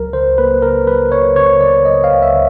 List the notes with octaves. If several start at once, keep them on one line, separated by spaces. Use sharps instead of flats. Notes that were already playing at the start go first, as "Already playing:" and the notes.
Already playing: C#2 F#3 A#4
C#3 C5
A#3 B4
C#3 A#4
F#3 B4
C#3 C#5
C#3 C#5
C#3 D5
F#3 D#5
F5
C#2
E5
C#3